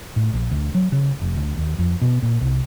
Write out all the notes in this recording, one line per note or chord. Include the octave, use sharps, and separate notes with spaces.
A2
A#1
D2
F#3
C#3
F1
D2
D#2
F2
B2
A#2
C2